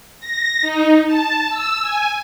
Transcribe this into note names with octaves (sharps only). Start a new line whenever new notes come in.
A#6
D#4
A5
E6
G#5